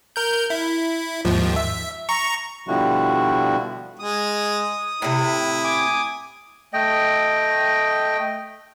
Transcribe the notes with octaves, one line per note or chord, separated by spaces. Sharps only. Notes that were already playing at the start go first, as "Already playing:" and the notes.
A#4 G6
E4
D#2 G#2 F3
E5
A#5 C#6
B2 D3 F3 G3 E4 F#4
G#3 D#6
A2 C3 E4
G#5 D6 D#6
A3 D#5 G5